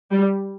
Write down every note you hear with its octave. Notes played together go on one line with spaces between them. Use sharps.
G3